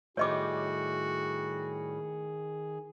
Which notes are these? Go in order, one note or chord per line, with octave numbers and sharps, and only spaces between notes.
A2 D#3 G3 F#4 G#4 C#5 D#5 D6